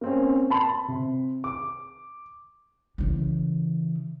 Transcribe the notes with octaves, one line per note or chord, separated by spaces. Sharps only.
A#3 C4 C#4
A5 B5 C6
C3
D6
C#3 E3